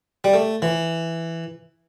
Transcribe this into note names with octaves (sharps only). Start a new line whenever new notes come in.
G3
A3
E3